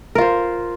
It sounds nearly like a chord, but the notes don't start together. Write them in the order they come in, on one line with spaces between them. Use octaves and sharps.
A#4 F4 C5